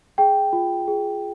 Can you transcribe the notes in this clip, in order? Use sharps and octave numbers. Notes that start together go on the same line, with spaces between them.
G#4 G5
F4
G#4